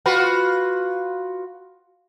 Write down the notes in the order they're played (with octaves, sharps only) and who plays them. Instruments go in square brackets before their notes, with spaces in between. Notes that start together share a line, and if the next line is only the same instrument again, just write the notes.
[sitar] F4 F#4 B4